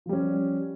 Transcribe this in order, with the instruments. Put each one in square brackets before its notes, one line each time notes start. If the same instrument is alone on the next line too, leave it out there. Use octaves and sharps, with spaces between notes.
[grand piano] F3
G3
C#4